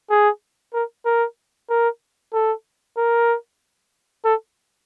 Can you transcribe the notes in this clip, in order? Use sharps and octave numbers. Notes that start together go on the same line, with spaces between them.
G#4
A#4
A#4
A#4
A4
A#4
A4